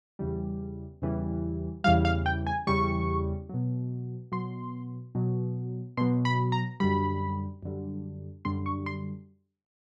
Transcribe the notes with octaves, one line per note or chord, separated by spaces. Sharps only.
E2 C#3 E3 G3
E2 C#3 E3 G3
E2 C#3 E3 G3 F5
F5
G5
G#5
E2 C#3 E3 G3 C#6
B2 F#3
B2 F#3 C6
B2 F#3
B2 F#3 C6
B5
A#5
F#2 D3 G3 B5
F#2 D3 G3
F#2 D3 G3 C6
C#6
C6